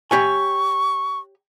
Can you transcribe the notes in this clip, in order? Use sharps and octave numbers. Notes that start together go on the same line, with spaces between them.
G4 C#5 G#5 C#6